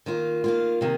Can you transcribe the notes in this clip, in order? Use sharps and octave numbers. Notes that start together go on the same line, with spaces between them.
D#3 A#3 F4
D#3 A#3 F4
C3 D#3 A#3